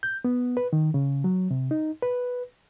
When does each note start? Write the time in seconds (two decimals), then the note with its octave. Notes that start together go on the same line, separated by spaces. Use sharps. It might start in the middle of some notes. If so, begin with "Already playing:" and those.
0.03 G6
0.25 B3
0.57 B4
0.73 D#3
0.94 C#3
1.24 F#3
1.51 C3
1.71 D#4
2.02 B4